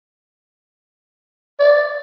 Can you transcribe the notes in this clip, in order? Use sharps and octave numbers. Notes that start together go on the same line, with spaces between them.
D5